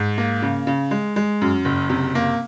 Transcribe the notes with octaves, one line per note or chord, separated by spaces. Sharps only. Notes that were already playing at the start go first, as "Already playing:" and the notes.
Already playing: G#2
A#3
C#3
C#3
G#3
G#3
F#2
F#1
C3
A#3